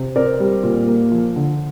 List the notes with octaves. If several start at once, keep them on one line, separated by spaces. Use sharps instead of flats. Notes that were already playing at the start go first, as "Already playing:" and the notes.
Already playing: C3
C4 A#4 D5
G3
A#2
A#3
F3
D3